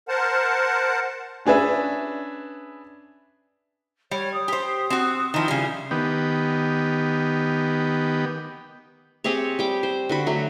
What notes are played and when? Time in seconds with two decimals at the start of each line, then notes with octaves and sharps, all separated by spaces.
0.08 A#4 C5 F#5 A5
1.46 C#4 D4 G#4 B4 E5
4.11 G3 C#5
4.34 D#6
4.48 G4 C5
4.90 C4 F#4
5.34 D#3 F3 E4
5.48 C#3 G3
5.91 D#3 B3 G4
9.24 C4 G4 G#4 C#5
9.59 G3 G5 D6
9.83 C5
10.09 D3 F#4 B5
10.26 F#3 A3